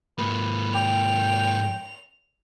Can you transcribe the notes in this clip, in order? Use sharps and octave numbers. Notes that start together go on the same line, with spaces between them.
G#2 A#3 B4
G5 F7